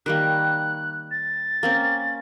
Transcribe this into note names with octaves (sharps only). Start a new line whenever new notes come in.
D#3 G3 A#3 F#6
A6
A#3 C4 C#4